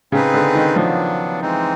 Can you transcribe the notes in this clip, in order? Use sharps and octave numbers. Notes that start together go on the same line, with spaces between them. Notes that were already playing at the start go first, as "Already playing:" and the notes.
C#3 C4 D#4 G#4 B4
D3
D#3
F3 F#3 B3 D4
E3 G#3 C4 D#4